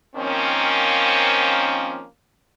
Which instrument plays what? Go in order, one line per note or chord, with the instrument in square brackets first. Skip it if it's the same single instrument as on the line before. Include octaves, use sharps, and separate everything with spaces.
[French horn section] D#3 F3 A#3 C4 C#4